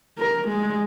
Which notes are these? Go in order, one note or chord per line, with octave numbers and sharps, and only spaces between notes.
A#4
G#3